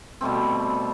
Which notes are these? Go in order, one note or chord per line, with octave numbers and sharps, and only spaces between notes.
B2 G3 A3 C4